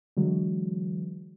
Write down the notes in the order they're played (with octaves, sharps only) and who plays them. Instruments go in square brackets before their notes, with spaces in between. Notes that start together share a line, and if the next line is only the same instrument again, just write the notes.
[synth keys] D3 E3 F#3 G#3